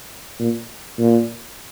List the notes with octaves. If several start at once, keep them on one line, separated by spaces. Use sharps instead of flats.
A#2
A#2